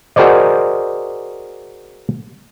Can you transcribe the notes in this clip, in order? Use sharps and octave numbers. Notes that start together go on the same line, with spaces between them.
F#4 G#4 A#4 C5 D5 D#5